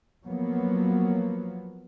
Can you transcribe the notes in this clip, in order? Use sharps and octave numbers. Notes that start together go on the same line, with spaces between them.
F3 F#3 A#3 B3